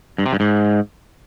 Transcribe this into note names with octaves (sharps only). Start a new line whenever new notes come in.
G2
C3
G2
G#2